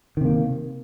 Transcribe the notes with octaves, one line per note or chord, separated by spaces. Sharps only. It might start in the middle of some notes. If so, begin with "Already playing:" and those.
C3 D#3 A#3